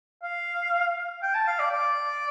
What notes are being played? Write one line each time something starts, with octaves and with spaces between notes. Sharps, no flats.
F5
G5
A5
F5
D5
D5